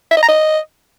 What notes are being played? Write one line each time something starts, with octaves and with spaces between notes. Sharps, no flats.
E5
D#5
A#5
D#5